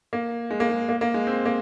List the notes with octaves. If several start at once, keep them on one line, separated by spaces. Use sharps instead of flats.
A#3
G#3
A#3
G#3
A#3
A#3
G#3
C4
A#3